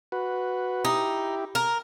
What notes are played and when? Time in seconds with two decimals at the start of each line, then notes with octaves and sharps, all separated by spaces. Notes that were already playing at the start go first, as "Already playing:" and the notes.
0.12 F#4 B4
0.85 D#4 E4 G4
1.55 A#4